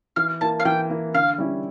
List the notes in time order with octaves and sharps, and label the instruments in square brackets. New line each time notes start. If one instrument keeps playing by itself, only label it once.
[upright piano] E3 [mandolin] F5
[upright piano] A#3 E4 [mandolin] A5
[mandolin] F5
[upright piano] E3 [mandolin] G5
[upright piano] A#3 E4
[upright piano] D3 [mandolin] F5
[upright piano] G3 C#4 E4